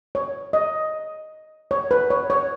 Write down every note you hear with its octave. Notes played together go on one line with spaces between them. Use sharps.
C#5
D#5
C#5
B4
C#5
C#5